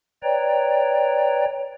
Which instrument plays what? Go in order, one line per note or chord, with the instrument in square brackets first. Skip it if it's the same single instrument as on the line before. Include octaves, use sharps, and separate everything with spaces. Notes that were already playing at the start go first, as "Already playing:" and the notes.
[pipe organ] B4 C#5 D5 G5 A#5